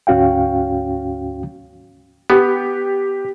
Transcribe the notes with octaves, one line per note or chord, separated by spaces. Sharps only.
D2 G#2 C#4 F#4 F5 G5
B3 G4